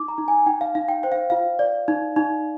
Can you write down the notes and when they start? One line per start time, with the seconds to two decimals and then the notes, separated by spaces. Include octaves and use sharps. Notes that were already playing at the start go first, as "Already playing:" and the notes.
Already playing: D#4 D6
0.08 A#5
0.18 D#4
0.28 G#5
0.47 D#4 G5
0.61 F5
0.75 D#4 F5
0.88 G5
1.03 C5 G5
1.12 F5
1.30 F4 F5
1.59 D5
1.88 D#4
2.16 D#4